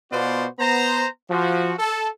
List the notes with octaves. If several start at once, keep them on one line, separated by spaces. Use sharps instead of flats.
B2 B3 F4 F#4 C5 D5
B3 C5 A#5
F3 F#4
A4